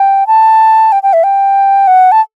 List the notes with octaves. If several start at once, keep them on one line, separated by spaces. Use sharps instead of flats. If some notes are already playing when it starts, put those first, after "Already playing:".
Already playing: G5
A5
G5
G5
E5
G5
F#5
A5